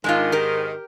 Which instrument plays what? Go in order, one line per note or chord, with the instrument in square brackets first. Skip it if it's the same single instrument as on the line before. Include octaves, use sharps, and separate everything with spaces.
[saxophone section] G#2 D#3 [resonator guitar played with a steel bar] G#3 D4 F4
[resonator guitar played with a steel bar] G4 A#4